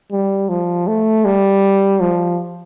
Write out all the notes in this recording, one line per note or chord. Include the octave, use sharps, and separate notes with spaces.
G3
F3
A3
G3
F3